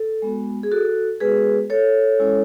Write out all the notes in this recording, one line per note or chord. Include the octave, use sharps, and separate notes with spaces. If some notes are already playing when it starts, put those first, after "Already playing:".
Already playing: A4
G#3 B3 F#4
G#4
F#4 A4
G#3 B3 F#4 G#4 B4
A4 C#5
G#3 C#4 E4